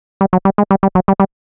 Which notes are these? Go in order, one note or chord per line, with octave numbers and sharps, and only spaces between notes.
G3
F#3
G3
G#3
G3
G3
F#3
G3
G3